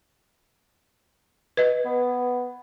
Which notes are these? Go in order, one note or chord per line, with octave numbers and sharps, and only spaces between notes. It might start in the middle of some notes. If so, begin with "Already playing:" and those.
B4 D#5
B3